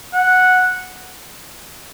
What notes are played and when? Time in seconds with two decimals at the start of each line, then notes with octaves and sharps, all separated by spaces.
0.14 F#5